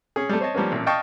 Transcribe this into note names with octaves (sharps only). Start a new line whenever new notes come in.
C#4 G#4
G3 A3
C5 C#5 D#5 A5
F3 G3 A#3 B3 C#4
A1 A#2
D#5 F5 G5 A5 C#6 D#6